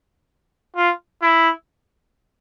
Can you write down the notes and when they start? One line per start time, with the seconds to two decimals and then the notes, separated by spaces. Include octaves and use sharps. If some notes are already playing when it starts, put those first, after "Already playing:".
0.76 F4
1.22 E4